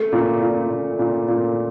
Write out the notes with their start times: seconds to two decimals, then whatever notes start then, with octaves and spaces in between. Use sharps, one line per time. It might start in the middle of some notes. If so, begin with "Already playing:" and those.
Already playing: A3
0.13 A#2
0.41 A#2
0.70 A#2
0.99 A#2
1.28 A#2